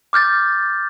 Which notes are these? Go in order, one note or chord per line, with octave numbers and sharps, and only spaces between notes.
D6 F6 G6 A6